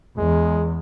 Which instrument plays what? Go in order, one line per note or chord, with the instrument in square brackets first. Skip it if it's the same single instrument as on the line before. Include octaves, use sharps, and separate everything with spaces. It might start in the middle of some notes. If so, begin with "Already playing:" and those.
[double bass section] E2 [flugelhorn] G#3